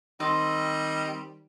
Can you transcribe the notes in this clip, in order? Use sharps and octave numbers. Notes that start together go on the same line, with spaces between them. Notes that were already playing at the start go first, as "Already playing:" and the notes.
D#3 G3 C4 D#5